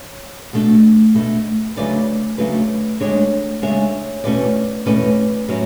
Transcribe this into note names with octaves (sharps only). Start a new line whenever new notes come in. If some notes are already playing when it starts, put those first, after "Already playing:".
Already playing: C#5
B2 A3 D4
B2 A3 D4
D2 C#3 F#3 A3 D4 B4 D5
D2 C#3 F#3 A3 D4 B4 D5
D2 C#3 G#3 D4 A4 C#5
D2 C#3 G#3 D4 C#5 E5
E2 B2 A3 C#4 B4 D5
E2 B2 A3 C#4 B4 D5
A2 F#3 C#4 E4